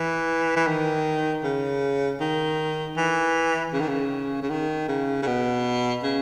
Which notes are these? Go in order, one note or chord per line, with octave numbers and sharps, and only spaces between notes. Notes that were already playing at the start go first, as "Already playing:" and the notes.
Already playing: E3
E3
D#3
C#3
D#3
E3
C#3
D#3
C#3
C#3
D#3
C#3
C#3
B2
C#3